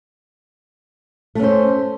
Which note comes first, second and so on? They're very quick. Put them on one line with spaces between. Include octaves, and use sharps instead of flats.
A3 C#4 C5